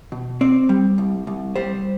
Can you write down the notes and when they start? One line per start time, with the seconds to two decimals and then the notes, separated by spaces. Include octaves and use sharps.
0.12 B2
0.41 C4 D5
0.69 G3
0.98 C2
1.27 C2
1.56 G3 C5